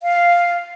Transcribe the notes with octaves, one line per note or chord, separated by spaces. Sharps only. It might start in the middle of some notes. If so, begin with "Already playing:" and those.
F5